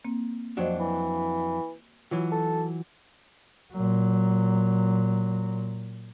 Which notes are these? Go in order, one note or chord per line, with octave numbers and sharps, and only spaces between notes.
A#3 C4
F2 F#3 D4 F#4 C5 D#5
E3
E3 F#3 F4 F#4
A4
A#2 F#3